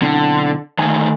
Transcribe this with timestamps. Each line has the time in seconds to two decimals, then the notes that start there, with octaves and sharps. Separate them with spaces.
0.02 B1 D3 C4 E4
0.79 D2 D#3 A3 G#5